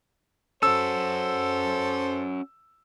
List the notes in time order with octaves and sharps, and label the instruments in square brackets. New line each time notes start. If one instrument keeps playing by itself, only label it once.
[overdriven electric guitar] C#4 F#4 [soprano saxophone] A4 [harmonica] C5 [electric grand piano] E6